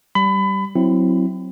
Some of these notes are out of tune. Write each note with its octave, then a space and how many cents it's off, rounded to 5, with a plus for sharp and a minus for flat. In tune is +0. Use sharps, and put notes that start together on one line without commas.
G3 -15 B5 +25
F#3 +0 C4 +0 E4 +0